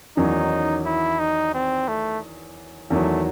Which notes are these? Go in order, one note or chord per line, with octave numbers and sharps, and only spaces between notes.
E2 D#3 F#3 C#4 D#4
E4
D#4
C4
A3
E2 D#3 F#3 A3